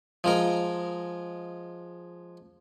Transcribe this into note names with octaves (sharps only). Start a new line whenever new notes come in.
F3 G#3 A#4